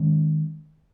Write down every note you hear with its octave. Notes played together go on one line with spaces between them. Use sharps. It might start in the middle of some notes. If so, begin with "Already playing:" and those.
Already playing: D#3 G#3 C#4